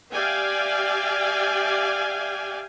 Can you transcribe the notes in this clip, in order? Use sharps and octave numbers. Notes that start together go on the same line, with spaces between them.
G4 D5 E5 F5 G5 G#5